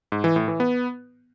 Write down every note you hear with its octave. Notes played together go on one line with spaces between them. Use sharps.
G#2
E3
A2
E3
B3